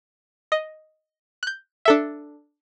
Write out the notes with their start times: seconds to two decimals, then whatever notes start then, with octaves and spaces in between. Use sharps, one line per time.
0.52 D#5
1.43 F#6 G6
1.85 D4 A4 E5